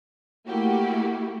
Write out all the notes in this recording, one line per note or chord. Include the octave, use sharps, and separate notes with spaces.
A3 A#3 E4 F#4 G4